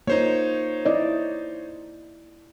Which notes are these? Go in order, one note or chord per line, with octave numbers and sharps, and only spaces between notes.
A#3 D#4 F4 C5 C#5
E4 D5 D#5